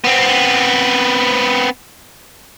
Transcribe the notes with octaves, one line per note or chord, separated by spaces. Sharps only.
B3 C4